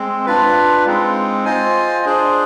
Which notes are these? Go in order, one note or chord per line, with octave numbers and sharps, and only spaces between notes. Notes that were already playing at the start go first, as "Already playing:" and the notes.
Already playing: G#3 C4
D4 F4 B4
G#3 C4 D#4
F4 C5 D#5 G#5
D4 G#4 C5